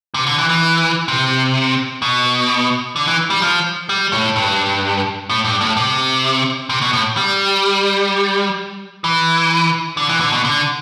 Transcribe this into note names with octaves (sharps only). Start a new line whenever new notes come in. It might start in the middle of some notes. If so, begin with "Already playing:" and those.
C3
D3
E3
E3
C3
B2
D3
E3
G3
F3
G3
A2
G2
A2
G2
A2
C3
C3
B2
A2
G3
E3
D3
E3
D3
B2
D3